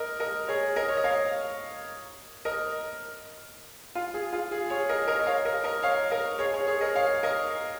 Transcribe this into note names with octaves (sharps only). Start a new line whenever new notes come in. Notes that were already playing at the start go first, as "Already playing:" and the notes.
Already playing: A#4 D#5
A#4 D#5
G#4 C#5
A#4 D#5
C#5
D#5
C#5 F5
A#4 D#5
F4
G#4
F4
G#4
G#4 C#5
A#4 D#5
A#4 D#5
D#5
C#5 F5
A#4 D#5
A#4 D#5
C#5 F5
A#4 D#5
G#4 C#5
G#4 C#5
G#4 C#5
A#4 D#5
C#5 F5
A#4 D#5